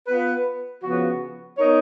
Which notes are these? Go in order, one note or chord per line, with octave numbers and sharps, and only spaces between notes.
B3 F4 B4
C#3 F3 B3 F#4
B3 D#4 A#4 C#5